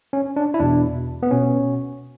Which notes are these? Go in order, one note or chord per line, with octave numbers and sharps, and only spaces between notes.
C#4
D4
E4
E2 B2 D4
B3
B2 C#4